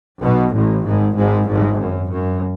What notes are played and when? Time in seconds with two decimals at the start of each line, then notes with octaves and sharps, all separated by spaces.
0.22 B1 B2
0.53 A1 A2
0.85 G#1 G#2
1.16 G#1 G#2
1.47 G#1 G#2
1.79 F#2
2.10 F#2